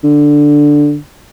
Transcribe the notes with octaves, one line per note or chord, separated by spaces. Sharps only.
D3